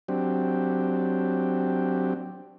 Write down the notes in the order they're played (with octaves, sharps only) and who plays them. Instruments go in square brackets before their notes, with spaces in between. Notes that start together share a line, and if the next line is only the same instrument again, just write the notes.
[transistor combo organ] F#3 C4 D4 G4